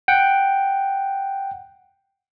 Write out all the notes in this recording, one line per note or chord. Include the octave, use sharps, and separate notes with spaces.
F#5 G5